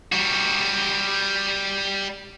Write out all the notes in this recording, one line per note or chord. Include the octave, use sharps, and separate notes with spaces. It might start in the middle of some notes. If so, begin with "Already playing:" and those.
G3 F#4